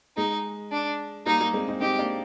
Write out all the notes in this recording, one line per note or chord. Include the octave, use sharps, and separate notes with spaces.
G#3 D#4
D4
G3 A#3 D#4
G3 A#3
G#3 C4
C4 D#4
C4 D#4 G4
A#3 D4